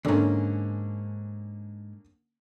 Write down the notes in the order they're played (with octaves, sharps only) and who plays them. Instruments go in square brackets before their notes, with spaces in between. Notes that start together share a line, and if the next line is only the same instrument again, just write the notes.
[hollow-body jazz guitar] C#2 G#2 [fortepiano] D3 A#3 C#4